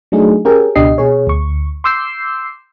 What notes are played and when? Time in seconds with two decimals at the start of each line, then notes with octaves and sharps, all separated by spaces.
0.12 F#3 A3 D4 D#4 G#4
0.45 C#4 G4 G#4 A#4 G5
0.76 C#2 B2 D4 G4 D#5 C7
0.98 B2 G#4 C#5
1.27 D2 C#6
1.84 C6 D6 E6 G6 C7